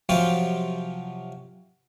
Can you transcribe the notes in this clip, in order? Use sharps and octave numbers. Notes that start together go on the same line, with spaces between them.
C3 F3 F#3 F4 G4